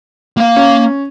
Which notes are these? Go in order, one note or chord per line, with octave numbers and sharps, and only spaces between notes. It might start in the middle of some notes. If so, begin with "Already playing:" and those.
A#3 F5
C#4